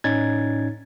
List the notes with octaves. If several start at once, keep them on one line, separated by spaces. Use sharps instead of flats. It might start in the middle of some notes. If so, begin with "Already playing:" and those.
A2 C#4 D#4 G#6 A6